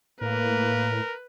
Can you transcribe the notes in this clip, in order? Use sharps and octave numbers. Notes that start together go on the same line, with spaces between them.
A2 A#3 A#4 B4